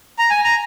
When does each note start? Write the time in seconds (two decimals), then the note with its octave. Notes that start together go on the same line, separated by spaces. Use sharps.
0.19 A#5
0.30 G#5
0.44 A#5